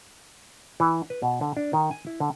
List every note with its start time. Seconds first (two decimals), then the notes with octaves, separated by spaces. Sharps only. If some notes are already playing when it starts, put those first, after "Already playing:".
0.80 E3
1.10 B4
1.22 B2
1.41 D3
1.57 D4
1.73 D#3
1.91 G#5
2.07 E4
2.20 D3